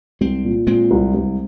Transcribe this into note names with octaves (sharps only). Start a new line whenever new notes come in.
C2 G#3 C4
A#2
A#2 G#3 C4
C2
C2